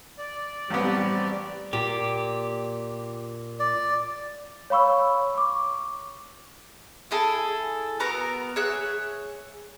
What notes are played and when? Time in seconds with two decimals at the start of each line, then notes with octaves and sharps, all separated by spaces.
0.18 D5
0.70 A1 G3 B3 C4 G4
1.73 A#2 G4
3.60 D5
4.70 C#5 F5 B5 C#6 E6
5.35 C#6 D6
7.11 E4 G#4 A4
8.00 B3 F#4 A#4 A#5
8.56 G#4 C#5 E5 F#6